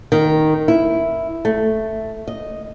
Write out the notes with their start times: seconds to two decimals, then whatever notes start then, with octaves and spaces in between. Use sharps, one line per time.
0.12 D#3
0.68 E4
1.45 A3
2.27 D#5